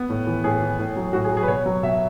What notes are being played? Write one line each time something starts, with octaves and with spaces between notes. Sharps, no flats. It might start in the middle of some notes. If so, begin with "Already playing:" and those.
Already playing: B3
A2
E3
A2 G#4
E3
A2
F#3
A2 F#4
G#4
F#3
G#4
B4
B2 C#5
F#3
B2 E5